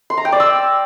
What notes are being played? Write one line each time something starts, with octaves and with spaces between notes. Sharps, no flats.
C6
A#5
G5
D5
E6